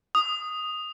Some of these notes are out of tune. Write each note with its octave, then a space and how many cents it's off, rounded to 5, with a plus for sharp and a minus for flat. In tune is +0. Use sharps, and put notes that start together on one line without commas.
D#6 +0